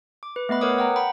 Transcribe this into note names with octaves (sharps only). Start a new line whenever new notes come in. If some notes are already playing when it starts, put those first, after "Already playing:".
D6
B4
A3 B3 D#5 B5
A#4 B4 C#5 F#5 D6 D#6
F#5 G5 A#5
F#5 G5 B5